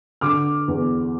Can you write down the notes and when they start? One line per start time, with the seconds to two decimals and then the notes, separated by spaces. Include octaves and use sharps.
0.21 D3 D6 F6
0.68 E2